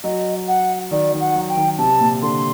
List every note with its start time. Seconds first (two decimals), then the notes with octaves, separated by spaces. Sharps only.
0.04 F#3 D#5
0.48 F#5
0.91 D#3 D5
1.13 D#3
1.20 F#5
1.35 F#3
1.49 G5
1.57 D#3
1.79 C3 A5
2.00 A#2
2.22 D3 C6